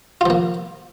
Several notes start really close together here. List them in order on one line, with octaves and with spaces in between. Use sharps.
F4 F3 A#3